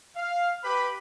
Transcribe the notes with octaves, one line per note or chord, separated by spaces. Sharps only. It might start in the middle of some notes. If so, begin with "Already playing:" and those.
F5
G4 B4 B5